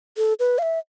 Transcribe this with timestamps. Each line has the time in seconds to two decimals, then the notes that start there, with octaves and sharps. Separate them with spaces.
0.17 A4
0.40 B4
0.58 F5
0.63 E5